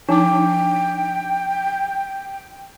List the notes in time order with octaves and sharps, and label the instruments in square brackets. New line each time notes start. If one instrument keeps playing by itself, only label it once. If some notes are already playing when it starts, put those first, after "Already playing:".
[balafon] F3 D6 [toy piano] D4 D#4 [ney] G5